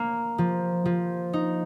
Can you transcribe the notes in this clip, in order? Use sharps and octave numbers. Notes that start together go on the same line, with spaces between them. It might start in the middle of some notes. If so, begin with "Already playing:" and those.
Already playing: A#3
F3
F3
D#4